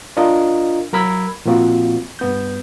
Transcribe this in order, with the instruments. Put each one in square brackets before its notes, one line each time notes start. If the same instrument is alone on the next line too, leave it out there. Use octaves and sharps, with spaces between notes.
[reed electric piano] D4 F4 A#4 D#5
F#3 A#4 B5 E6 G#6
A#2 F3 A#3 C4 F4 F#4
G2 B3 G6